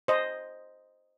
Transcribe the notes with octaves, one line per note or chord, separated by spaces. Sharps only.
C5 D#5